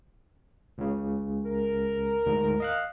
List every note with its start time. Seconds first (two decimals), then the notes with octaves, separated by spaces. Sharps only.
0.78 C#2 C#3
1.45 A#4
2.26 D2 G#2
2.60 D#5 F5 F#6